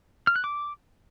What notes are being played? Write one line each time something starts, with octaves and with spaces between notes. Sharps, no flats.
F6
F#6
D6